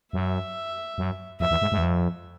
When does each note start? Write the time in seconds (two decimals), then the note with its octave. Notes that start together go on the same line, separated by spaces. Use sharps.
0.13 F#2 E5
0.98 F#2
1.40 F2 E5
1.51 E2
1.62 G#2
1.72 G#2
1.78 E2
1.83 F2